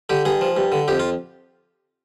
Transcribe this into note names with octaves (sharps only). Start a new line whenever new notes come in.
D3 G4
G2 G#4
F3
G2
D3
F2 G4
F4